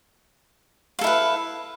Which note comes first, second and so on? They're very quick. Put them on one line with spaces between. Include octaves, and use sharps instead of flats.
F5 A4 E4 B4